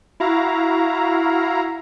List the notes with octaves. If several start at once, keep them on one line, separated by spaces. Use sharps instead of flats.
E4 F#4 F5 A#5